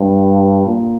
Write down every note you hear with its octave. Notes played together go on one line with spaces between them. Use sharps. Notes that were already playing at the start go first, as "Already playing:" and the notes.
Already playing: G2
A#2